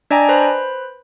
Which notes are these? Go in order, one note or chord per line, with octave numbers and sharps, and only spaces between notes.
D4 D5 D#5 G5 G#5 A#5
B4 C5 B5